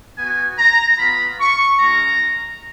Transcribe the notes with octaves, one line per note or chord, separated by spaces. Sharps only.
B3 F#4 G#5
A#5
B3 F4 B5
C#6
G#3 C#4 F4 A#5